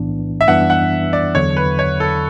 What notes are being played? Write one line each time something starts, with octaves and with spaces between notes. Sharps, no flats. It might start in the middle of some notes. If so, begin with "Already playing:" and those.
Already playing: B1 A2 E3 B3 D4
E5
F#2 E3 G3 B3 D4 F#5
F#5
D5
E2 D3 F#3 C#5
B4
C#5
A4